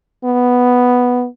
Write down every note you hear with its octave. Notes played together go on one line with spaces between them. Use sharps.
B3